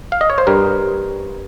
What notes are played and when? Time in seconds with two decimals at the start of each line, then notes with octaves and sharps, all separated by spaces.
0.12 F5
0.21 D#5
0.30 C#5
0.38 C5
0.47 G2 G3 A#4